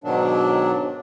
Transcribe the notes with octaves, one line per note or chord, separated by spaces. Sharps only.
G#2 B2 D#3 F#3 D4